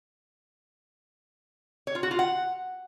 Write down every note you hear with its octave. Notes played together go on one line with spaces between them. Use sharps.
C#5
F4
F#4
F4
F#5